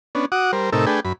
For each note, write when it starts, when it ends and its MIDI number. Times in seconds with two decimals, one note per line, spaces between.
0.15 0.25 59
0.15 0.25 61
0.15 0.25 62
0.32 0.51 66
0.32 0.51 78
0.32 0.51 86
0.32 0.51 87
0.53 0.70 55
0.53 0.70 70
0.53 0.70 72
0.72 0.86 45
0.72 0.86 48
0.72 0.86 63
0.72 0.86 69
0.72 0.86 70
0.72 0.86 88
0.86 1.00 57
0.86 1.00 62
0.86 1.00 68
0.86 1.00 71
0.86 1.00 79
1.05 1.13 42
1.05 1.13 83